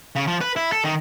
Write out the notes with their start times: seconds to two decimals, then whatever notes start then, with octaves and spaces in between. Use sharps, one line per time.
0.15 C#3
0.27 F3
0.41 B4
0.56 E4
0.72 A4
0.84 D#3